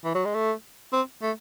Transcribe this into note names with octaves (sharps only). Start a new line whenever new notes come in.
E3
F#3
G#3
A3
C4
A3